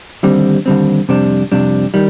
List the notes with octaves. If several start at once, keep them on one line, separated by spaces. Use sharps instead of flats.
D#2 D3 G3 C4
D#2 D3 G3 C4
F2 C3 G3 D4
F2 C3 G3 D4
D#3 G3